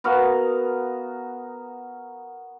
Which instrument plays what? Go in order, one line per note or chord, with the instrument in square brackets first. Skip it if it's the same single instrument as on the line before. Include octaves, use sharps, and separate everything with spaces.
[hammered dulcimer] B3 F#4 A#4 F5